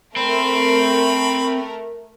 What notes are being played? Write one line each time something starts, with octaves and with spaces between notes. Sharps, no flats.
A3 C4 A#4 B5